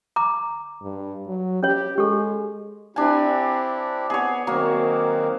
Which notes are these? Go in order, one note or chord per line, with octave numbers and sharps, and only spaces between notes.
A#5 D6
G2
F#3
C#4 G4 C#5
G#3 G4 A4
C4 D4 E4 G4 G#5
B3 G#4 C#5
D#3 F#3 A#3 C4